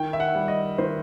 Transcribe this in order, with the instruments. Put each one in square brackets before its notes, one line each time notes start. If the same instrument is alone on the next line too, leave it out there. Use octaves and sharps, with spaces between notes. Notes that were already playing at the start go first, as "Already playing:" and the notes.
Already playing: [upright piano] D#3 G5
E5
F#5
G3
D#5
D#3 C5